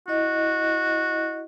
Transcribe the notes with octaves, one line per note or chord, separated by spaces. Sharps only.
E4 F#4 D#5